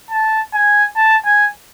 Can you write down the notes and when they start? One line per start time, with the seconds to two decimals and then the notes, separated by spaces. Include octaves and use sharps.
0.11 A5
0.54 G#5
0.97 A5
1.25 G#5